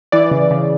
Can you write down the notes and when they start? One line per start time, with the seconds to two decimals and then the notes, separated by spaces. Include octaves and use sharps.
0.12 E3 D5
0.31 C#3
0.51 C#3